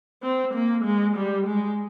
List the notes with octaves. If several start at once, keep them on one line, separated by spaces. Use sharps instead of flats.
C4
A#3
G#3
G3
G#3